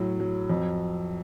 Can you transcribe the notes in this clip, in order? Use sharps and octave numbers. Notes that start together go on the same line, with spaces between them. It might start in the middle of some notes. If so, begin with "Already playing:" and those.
Already playing: A2 F#3
F#3
F2